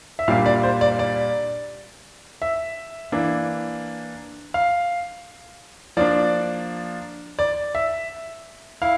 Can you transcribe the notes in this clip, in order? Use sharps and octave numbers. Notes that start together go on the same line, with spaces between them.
E5
A#2 G3 A#3 D4 F5
D5
C5
D5
D5
E5
E3 A#3 D4
F5
F3 A#3 D4 D5
D5
E5
E4 F5